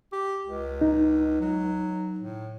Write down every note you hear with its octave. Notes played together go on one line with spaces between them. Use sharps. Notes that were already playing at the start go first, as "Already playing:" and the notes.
G4
C#2
D#4
F#3
A2